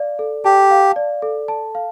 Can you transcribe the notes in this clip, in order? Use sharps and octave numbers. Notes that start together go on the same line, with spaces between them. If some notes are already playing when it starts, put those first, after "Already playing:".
Already playing: D5 F5
A4
G4 A5
F5
D5
A4
A5
F5